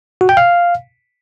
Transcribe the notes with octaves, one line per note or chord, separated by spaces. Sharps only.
F#4
G5
F5